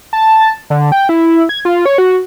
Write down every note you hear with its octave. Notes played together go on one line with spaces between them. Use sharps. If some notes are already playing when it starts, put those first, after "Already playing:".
A5
D3
G5
E4
G#6
F4
C#5
F#4